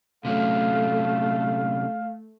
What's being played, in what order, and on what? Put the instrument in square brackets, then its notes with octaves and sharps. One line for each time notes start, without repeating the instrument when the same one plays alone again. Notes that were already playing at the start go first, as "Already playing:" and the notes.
[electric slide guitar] C3 F#3 C#4 [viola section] A3 [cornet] F5